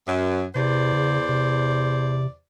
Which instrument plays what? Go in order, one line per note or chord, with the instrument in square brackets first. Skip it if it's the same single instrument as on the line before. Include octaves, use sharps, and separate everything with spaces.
[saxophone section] F#2
[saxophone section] E2 C5 D5 [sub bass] C3
[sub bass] C#3
C3